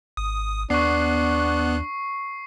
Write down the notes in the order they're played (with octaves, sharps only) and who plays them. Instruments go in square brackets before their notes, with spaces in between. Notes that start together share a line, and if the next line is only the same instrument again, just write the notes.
[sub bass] G#1 [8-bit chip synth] D#6
[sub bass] D#2 [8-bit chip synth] B3 F#6 [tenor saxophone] D4 [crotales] C#6 C7